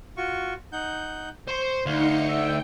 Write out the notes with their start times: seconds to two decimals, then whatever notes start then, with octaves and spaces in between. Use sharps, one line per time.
0.17 F4 F#4 C#6
0.72 D#4 F#5 G6
1.48 C5 C6 C#6
1.86 D2 D#4 F5 C6 C#7
2.28 E5 G5